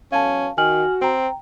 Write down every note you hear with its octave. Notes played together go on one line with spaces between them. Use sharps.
E2 F#3 C#4 A4 F5 A5
D#3 F#4 G#5 F6 F#7
C4 G5 A#5